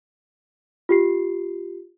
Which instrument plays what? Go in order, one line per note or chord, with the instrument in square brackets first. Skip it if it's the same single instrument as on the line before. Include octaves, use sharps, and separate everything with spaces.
[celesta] F4 G4 C7